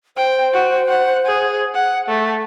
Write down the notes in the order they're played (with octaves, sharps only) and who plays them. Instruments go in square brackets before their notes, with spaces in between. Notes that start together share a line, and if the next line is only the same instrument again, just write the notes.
[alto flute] C5 [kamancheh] G5
[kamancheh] F#4
F#5
G#4
F#5
A3